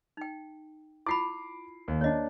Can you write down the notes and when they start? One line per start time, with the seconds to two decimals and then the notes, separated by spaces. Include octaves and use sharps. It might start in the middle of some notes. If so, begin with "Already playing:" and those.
0.17 D#4 G5
1.06 E4 F4 B5 D6 C7
1.88 D#2
2.01 A#3 D4 C#5 D#5